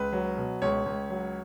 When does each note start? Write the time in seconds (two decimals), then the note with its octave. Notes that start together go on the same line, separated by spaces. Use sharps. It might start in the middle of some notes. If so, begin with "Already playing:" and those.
Already playing: C#2 B4
0.13 F#3
0.38 B2
0.62 C#2 C#5
0.86 C#2
1.10 F#3